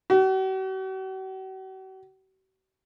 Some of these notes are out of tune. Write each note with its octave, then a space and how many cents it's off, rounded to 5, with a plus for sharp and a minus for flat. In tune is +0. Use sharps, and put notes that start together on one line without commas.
F#4 +45